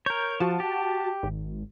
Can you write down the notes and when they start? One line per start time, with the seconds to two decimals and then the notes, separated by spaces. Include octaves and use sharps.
0.06 A#4 C#5 G6
0.40 F3 F#4 A5
0.60 G4
1.23 G#1